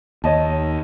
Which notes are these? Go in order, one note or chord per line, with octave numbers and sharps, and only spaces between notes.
D#2 C#5 D#5 A5